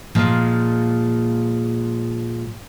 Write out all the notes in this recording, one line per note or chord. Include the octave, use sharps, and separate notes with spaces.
A#2 F3 G#3